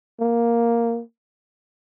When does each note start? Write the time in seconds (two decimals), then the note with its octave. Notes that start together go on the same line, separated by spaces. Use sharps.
0.20 A#3